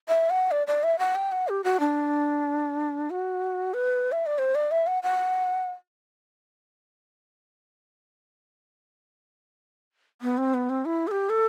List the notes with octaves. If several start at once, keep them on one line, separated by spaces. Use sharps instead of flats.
E5
F#5
D5
D5
E5
F#5
G5
F#5
G4
F#4
D4
F#4
B4
E5
D5
C5
D5
E5
F#5
F#5
B3
C4
B3
C4
E4
A4
G4
A4